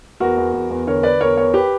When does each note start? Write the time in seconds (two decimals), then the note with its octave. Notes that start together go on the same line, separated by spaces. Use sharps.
0.20 E2 F#4 A#4
0.37 E2
0.54 E2
0.71 E2
0.87 D3 A#4 C#5
1.03 D3 B4 D5
1.21 E2 A#4 C#5
1.37 E2 A#4 C#5
1.54 G4 B4